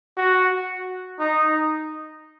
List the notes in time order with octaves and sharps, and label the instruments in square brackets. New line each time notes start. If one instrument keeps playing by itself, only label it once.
[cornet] F#4
D#4